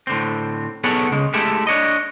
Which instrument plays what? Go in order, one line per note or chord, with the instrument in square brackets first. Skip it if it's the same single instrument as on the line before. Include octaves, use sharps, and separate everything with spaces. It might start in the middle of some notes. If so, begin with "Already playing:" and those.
[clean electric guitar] A2 D3 C4
B1 B3 G#4 A4 C#5 F#5
C#3 G#3
G#3 A3 E4 G4 A4
D4 C#5 D#5